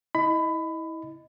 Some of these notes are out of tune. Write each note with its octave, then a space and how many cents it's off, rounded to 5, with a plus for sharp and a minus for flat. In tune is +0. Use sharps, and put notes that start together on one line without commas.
E4 -30 D#5 +0 B5 +20